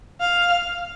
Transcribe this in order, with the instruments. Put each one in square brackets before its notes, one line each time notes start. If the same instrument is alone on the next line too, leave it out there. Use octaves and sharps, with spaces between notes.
[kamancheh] F5